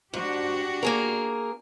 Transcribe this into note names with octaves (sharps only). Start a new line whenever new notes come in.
G#2 D4 F#4 G4
A#3 G#4 A#4